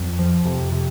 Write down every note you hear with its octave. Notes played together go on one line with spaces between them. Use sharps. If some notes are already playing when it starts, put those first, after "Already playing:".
Already playing: F2
F3
F2 C3
C3